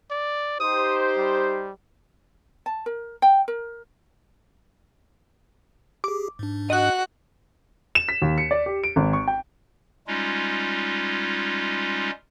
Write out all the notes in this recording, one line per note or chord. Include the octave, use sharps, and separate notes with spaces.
D5
D#4 G4 C5 D#6
G3
A5
A#4
G5
A#4
G4 G#4 D6
G#2 D4
F#4 D#5 F#5 F#6
E7
B6
D#2
C#7
D5
G4
D7
G#1
C#6
G5
G3 G#3 C#4 D#4 F4